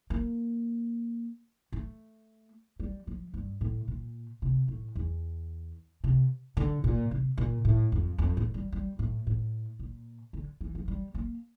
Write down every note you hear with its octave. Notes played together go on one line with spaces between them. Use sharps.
A#3
A3
G3
F3
G2
A2
A#2
C3
A2
E2
C3
D3
A#2
C3
A#2
A2
F2
F2
A2
G3
G3
A2
A2
A#2
D3
E3
F3
G3
A#3